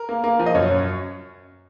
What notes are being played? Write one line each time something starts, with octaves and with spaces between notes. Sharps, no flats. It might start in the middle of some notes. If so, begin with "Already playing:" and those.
Already playing: A#4
A#3
A#3
F3
D#5
F#2 C#5
F#2